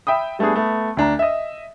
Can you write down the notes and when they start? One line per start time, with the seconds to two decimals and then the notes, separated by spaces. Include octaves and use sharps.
0.07 E5 G5 B5 D#6
0.39 G3 A3 B3 D4 G#4
0.56 A3 B3
0.97 D2 D4 A#5
1.19 D#5 E5